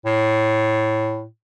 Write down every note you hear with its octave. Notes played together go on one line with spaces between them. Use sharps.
A2